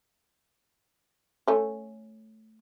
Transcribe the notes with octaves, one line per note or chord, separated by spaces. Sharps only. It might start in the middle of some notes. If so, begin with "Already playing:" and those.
A3 C#4